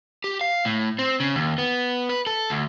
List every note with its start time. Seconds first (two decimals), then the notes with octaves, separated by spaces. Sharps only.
0.24 G4
0.41 F5
0.65 A2
0.99 C4
1.20 C#3
1.35 D#2
1.58 B3
2.09 B4
2.27 A4
2.50 D2